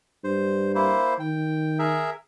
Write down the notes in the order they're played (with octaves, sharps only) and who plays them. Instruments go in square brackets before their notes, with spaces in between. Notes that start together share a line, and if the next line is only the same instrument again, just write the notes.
[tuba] G2 [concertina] C5
[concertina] A#3 E4 C5
[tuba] D#3 [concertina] G5
[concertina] G#4 A#4 E5